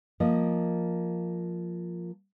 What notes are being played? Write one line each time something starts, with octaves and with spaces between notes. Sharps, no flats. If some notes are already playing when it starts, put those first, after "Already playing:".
F3 A#3 D#5